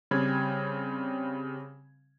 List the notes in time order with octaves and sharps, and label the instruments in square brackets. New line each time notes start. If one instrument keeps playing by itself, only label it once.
[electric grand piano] C#3 G3 C4 B5 G#6